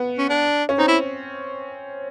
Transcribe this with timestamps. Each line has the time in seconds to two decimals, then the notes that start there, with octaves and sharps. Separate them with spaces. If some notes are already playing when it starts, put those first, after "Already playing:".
Already playing: B3
0.18 C#4
0.30 D4
0.69 C#4
0.78 C4 D#4
0.88 E4